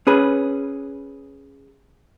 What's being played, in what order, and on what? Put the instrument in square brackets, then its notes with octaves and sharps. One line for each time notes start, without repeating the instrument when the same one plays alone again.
[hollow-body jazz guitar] C#4 G#4 B4